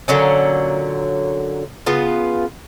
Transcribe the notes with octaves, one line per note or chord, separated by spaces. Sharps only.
A#2 D3 F#3 C#4
C#3 B3 F4